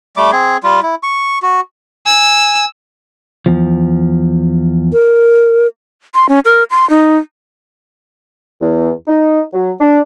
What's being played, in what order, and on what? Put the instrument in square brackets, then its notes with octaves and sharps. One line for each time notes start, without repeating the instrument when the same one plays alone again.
[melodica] G3 A3 D6
C4 G#4
G3 F4
E4
C#6
F#4
[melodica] G#5 [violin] E6
[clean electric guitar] E2 F3
[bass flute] A#4
[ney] C6
C#4
A#4
C6
D#4
[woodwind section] E2
D#4
F#3
D4